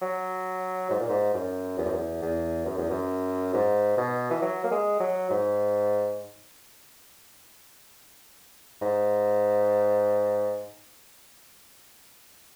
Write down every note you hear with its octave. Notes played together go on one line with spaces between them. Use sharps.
F#3
G#2
A#2
G#2
F#2
E2
F#2
E2
E2
F#2
E2
F#2
G#2
B2
E3
F#3
A#3
G#3
F#3
G#2
G#2